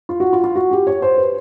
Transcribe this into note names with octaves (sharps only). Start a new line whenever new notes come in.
F4
F#4
F4
F4
F#4
G4
C#5
C5
B4